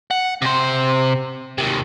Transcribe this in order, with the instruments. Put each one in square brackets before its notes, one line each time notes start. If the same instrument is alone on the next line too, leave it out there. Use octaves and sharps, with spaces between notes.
[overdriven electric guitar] F#5
C3 C5
D#2 C3